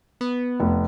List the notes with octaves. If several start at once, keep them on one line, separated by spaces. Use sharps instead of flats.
B3
F1